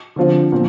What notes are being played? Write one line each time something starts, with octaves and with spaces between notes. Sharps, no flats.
D3 F3 C4 F4
A#2 F3 C4